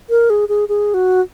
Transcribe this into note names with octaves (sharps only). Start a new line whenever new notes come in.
A#4
G#4
G#4
G#4
F#4